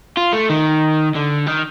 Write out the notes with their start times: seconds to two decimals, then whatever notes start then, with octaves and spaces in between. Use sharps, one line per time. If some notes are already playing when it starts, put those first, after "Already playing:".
0.17 F4
0.33 A3
0.50 D#3
1.15 D3
1.46 D#3